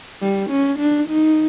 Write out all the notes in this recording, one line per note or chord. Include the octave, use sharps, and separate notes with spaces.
G3
C#4
D4
D#4